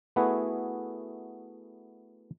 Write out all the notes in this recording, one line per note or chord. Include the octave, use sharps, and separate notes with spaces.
A3 B3 E4 F#4 G#4 B4